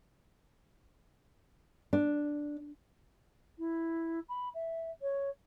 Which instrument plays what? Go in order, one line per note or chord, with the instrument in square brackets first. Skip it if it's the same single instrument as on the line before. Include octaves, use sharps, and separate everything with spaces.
[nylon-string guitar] D4
[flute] E4
B5
E5
C#5